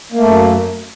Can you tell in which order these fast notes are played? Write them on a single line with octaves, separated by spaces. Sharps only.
A#3 A3 F#2